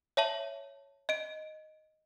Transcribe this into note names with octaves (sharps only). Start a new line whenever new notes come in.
C#5 E5 A5 F#7
D#5 D7